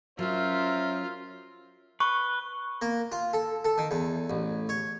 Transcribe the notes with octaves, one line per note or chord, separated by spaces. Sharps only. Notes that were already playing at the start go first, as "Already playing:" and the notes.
F#3 C#4 F4 A#4 C5 E5
B4 C#6
A#3
F4
A4
A4
D#3
E2
A1
C#5